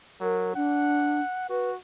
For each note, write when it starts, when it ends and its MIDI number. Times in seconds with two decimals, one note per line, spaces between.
0.21 0.53 54
0.21 0.53 70
0.56 1.21 62
0.56 1.47 78
1.50 1.76 66
1.50 1.70 71